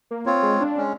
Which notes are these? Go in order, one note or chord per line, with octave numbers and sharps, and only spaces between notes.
A#3
C4 F4 C#5
G#3
D4
G#3 C#4